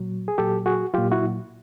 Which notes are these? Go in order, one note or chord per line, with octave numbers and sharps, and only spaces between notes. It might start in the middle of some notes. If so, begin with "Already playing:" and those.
Already playing: A#2 F#3
G#4
A#2 F#3 G4 A4
F#4 G#4
A#2 F#3 F4 G4
E4 F#4